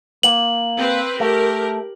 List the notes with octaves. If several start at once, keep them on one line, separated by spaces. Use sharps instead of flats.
A#3 F#7
C4 B4
A3 G4 A#4